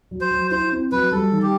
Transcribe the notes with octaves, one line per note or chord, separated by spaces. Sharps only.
F#3
C5
F#3
E4 C5
C4
F#3 B4
G3 A4
D#3
G4